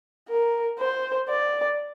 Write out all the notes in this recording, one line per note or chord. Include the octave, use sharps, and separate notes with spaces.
A#4
C5
D5